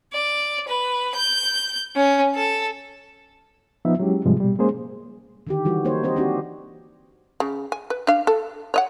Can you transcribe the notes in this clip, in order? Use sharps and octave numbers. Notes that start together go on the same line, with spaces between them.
D5
B4
G6
C#4
A4
F3 B3 D#4 E5
F#3 G#3 C#4 E4 G4
G#2 C3 F3 G3 G#3
B2 G3
G#3 A#3 C#4 G#4 C5
D3 D#3 G4
E3 G3 F#4
A#3 D#4 C5 C#5
C4 G4 C5 D#5
C4 D4 F#4 G4
C#3
G#5
B4
D4 F5
A4
C#5 D#5 F#5